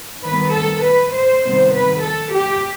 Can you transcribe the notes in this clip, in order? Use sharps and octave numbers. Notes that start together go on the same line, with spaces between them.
D#3 G3 B3 B4
A4
B4
C5
C3 D#3 G3 B3
B4
A4
G4